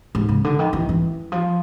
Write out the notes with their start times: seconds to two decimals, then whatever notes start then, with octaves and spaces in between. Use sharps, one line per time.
0.15 G#2
0.29 C#3
0.44 D3
0.59 D#3
0.73 E3
0.89 E3
1.32 F3